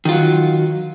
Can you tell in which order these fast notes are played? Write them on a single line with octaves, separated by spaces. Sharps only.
D#3 F4 F#3